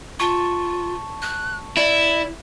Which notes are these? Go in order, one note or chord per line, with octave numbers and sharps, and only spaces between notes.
F4 A5 C#6
F#6
E4 D5